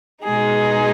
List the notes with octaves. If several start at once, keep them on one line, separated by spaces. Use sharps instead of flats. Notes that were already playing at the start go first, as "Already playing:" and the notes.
B2 G#3 D#4 G#4